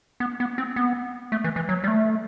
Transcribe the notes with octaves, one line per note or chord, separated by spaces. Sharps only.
B3
B3
C4
B3
A3
E3
E3
F#3
G3
A3